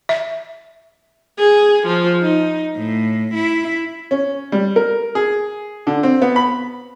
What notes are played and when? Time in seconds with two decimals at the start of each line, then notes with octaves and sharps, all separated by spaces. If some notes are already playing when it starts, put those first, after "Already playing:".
0.09 E5
1.37 G#4
1.86 F3
2.19 D#4
2.77 A2
3.35 E4
4.11 C#4
4.52 G3
4.76 A#4
5.15 G#4
5.87 D3
6.03 C4
6.22 B3
6.36 B5